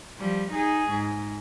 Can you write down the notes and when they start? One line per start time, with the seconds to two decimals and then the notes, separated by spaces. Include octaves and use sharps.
0.19 F3 G3
0.51 D#4 G#4
0.90 G#2